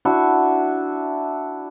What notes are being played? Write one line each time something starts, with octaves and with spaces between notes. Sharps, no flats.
D4 E4 F#4